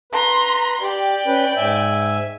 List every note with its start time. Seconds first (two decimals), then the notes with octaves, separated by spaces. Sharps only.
0.13 B4 A#5 C6
0.82 G4 D5 G5
1.27 C#4 B4
1.56 G#2 E5 G#5